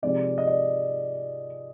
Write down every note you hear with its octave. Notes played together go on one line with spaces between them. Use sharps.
C3 F3 G#3 C4 D#4 D5
D#5
D5